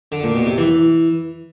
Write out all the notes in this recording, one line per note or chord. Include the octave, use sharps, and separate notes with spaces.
D3
A#2
B2
C3
E3